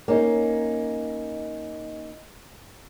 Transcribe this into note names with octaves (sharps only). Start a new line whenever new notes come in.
A#3 C#4 D#4